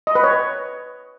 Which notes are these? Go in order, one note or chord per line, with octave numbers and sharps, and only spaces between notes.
D#5
B4
C#5